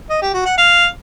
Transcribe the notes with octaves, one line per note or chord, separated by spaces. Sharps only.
D#5
G4
F#4
F#5
F5